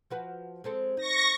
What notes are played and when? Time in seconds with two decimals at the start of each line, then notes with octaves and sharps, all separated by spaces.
0.11 F3 F#4 B4
0.64 G#3 C4 A4
0.97 D#4 C#6 A#6